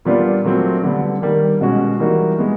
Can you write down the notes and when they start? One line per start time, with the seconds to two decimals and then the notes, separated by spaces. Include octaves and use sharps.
0.05 A#2 G3 B3 D4 F4
0.44 A#2 F#3 A3 C4
0.84 D3 G3 B3
1.22 D#3 G3 A#3
1.61 B2 G#3 C#4 F#4
2.00 E3 G3 A#3 D#4 F#4
2.39 G#3 B3